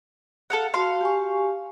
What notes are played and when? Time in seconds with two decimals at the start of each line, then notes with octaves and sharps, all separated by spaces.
0.50 A4 F5 F#5
0.74 F#4 F5 A5 C6
1.01 G4 G#5 C#6